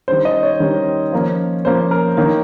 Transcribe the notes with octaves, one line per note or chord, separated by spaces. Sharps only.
D#3 G3 C#4 C5
D#5
C#5
D#3 G3 C#4
F3 A#3 C#4
F3 A#3 C#4 C5
A#4
D#3 A#3 C#4